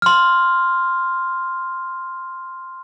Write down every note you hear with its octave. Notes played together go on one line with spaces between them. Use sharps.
C6 F6